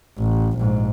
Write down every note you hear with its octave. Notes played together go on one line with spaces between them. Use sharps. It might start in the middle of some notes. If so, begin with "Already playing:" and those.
A1
A#1 G#2